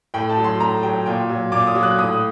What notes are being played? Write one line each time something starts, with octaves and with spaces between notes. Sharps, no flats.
A2 G5
A5
F#3
C6
A2 A#5
F#3 G5
A#2 G5
F#3
A#2 D6
D#6
F#3
F#6
A2 D#6